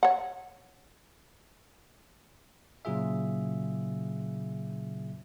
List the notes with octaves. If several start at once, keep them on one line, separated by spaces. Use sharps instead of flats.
C#5 F#5
A#2 C#3 F#3 F4 G#4 E5